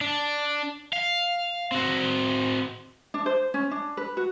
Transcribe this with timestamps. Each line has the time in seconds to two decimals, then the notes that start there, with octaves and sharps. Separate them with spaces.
0.01 D4
0.93 F5
1.72 C4 F#4
3.14 D4
3.26 C5
3.54 C#4
3.71 D4
3.97 B4
4.17 F#4